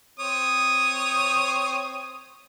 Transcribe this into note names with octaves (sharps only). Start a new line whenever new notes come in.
C4 C#5 D#6